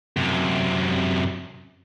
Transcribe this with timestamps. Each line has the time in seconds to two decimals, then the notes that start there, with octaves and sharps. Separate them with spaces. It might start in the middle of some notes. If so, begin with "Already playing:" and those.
0.17 F#2 C3